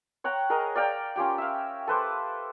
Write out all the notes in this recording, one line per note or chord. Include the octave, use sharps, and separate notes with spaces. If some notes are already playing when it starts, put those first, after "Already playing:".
C#5 F#5 G5 A#5
G#4 A#4 D#5 A#5
D5 F5 G5 A#5
C#4 F4 G4 G5
E5 F5
A4 B4 C5 D6